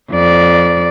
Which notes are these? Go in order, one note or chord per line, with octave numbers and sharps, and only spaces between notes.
F2 D5